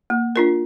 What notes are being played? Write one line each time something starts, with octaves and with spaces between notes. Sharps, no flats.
A#3
D4 F4 A#4